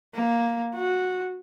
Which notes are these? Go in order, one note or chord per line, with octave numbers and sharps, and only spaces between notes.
A#3
F#4